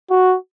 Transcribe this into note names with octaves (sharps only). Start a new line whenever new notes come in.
F#4